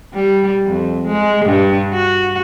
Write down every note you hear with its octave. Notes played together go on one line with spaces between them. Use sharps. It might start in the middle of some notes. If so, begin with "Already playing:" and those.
G3
F2
G#3
G2
F#4